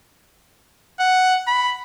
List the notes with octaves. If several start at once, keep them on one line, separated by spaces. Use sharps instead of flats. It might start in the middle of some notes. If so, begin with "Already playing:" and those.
F#5
B5